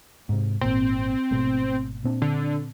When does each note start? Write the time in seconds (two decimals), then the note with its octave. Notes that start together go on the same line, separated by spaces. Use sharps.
0.29 G#2 C3
0.61 G#1 A#2 C4
1.31 G#1 B2 A3
2.04 A#2 C4 D4
2.22 D3